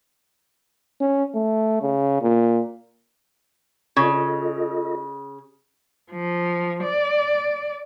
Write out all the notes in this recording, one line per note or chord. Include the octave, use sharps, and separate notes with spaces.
C#4
A3
C#3
A#2
C#3 F4 A4 D#5
F3
D5